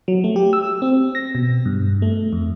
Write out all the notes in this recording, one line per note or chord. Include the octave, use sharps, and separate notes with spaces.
F#3
A3
G4
E6
C4
A#6
B2
G2
A3
F2